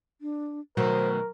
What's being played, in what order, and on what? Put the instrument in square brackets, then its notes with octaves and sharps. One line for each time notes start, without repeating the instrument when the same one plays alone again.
[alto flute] D4
[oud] B2 D#3 A3 [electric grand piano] F#3 [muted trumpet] A#4 [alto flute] C5